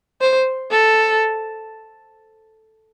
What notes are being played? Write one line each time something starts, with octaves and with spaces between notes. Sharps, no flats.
C5
A4